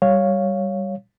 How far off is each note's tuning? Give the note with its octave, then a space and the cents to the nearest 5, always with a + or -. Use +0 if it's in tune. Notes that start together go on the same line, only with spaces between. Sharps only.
G3 +0 C#5 +0 F5 +0